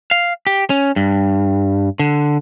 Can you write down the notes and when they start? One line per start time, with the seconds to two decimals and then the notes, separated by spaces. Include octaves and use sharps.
0.11 F5
0.47 G4
0.70 C#4
0.96 G2
1.99 D3